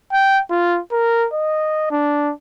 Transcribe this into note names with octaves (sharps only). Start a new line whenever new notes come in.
G5
F4
A#4
D#5
D4